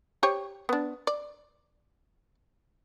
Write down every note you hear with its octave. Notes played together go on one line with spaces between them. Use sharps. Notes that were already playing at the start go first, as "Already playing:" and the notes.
G4 C5 C#5
B3 D4
D5